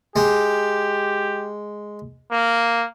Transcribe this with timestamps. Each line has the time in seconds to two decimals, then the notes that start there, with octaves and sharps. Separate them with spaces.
0.16 G#3 G4
2.32 A#3